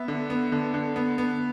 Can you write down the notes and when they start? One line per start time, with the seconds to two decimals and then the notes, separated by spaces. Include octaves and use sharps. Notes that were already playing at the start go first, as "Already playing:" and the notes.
Already playing: B3 E5
0.08 D3
0.30 B3
0.52 D3
0.74 D3
0.96 B3
1.18 B3